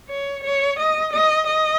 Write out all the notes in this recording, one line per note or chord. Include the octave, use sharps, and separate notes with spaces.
C#5
C#5
D#5
D#5
D#5